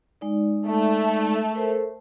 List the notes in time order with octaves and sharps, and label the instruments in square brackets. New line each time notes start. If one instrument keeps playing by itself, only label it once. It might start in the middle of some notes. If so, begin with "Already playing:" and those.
[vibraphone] G#3 D#4 D5
[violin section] A3
[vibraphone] A4 A#4 C5